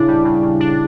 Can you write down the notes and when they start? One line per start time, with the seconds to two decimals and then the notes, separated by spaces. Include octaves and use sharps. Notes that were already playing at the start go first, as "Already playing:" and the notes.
Already playing: C#3 D4 E4
0.08 G3
0.25 C#3
0.43 C#3
0.60 D4